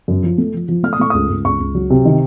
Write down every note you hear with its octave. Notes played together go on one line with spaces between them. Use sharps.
F#2
F3
A3
F3
F3
A3 F6
D#6
A3 C#6
C#2 D#6
C#2
C#2 C#6
C#2
F#3
C3
D#3